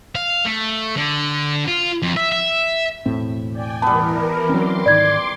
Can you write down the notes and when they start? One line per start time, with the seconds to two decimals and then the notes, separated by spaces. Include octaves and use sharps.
0.16 F5
0.46 A3
0.97 D3
1.68 F4
2.02 F2
2.17 E5
2.32 E5
3.06 E1 A2 C4
3.50 D5 G5 G#5
3.82 E3 G3 B3 A#4 A5
4.49 F#3 C4 C#4 C6 D6
4.86 G#2 D#3 D5 G#6